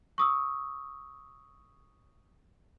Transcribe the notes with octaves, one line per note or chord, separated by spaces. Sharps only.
C#6 D#6 E6